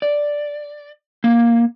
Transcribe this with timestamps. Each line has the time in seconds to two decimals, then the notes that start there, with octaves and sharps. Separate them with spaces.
0.02 D5
1.24 A#3